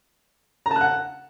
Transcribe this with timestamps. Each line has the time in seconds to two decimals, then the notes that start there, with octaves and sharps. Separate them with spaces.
0.66 A#5
0.71 A5
0.76 F#6
0.81 F#5